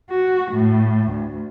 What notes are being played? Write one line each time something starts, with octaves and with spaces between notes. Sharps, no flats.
F#4
A2
D2